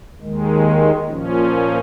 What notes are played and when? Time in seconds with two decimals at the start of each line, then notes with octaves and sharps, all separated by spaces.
0.21 D#2 D#3 G#3
1.08 A#2 F3 C#4